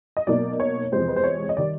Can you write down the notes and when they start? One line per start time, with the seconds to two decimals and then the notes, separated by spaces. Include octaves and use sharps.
0.17 D#5
0.27 B2 F#3 A#3 D#4 D5
0.60 C#5
0.92 E2 C3 F3 G#3 C4 C5
1.08 B4
1.16 C5
1.24 C#5
1.49 D#5
1.57 D#3 G3 D5